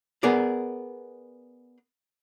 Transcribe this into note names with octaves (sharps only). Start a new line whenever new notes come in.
B3 G#4 A#4 D5